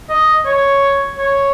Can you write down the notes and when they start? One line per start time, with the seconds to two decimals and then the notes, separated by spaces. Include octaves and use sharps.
0.09 D#5
0.46 C#5
1.18 C#5